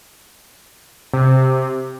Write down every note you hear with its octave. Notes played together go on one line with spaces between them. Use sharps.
C3